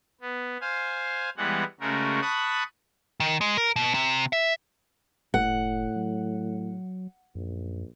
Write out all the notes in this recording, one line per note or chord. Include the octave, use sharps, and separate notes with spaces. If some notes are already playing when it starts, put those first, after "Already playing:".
B3
C5 F5 G#5
E3 G3 G#3 B3 F#5
C#3 G#3 A3 C#4 F#4 A#4
A5 B5 C#6 D#6 F#6
D#3
G#3
A#4
B2
C3
E5
F#1 A2 F#5
F#3
A#1 F#2